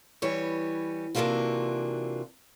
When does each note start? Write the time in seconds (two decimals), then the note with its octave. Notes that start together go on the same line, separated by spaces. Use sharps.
0.22 E3 G3 B3 C#5
1.15 C3 E3 A#3 D4 F4 F#4